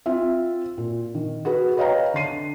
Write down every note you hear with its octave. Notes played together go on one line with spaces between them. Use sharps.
C4 F4 E5
A#2
D#3
F#4 G#4 B4
B4 C#5 D#5 F5 G5 A#5
D3 D4 C7 D#7